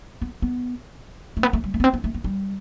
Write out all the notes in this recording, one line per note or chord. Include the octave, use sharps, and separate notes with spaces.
B3
B3
A3
B3
A3
G3
A3
B3
C4
B3
A3
B3
G3